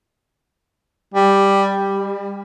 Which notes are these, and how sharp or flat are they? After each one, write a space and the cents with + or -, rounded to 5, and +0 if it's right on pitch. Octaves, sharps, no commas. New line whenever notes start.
G3 +5
G3 +35